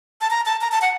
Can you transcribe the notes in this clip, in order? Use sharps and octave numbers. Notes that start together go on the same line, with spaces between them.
A5
A#5
A5
A#5
A5
F#5